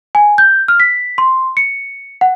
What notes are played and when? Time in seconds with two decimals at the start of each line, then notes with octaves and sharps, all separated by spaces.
0.15 G#5
0.38 G6
0.68 F6
0.80 B6
1.18 C6
1.57 C#7
2.21 F#5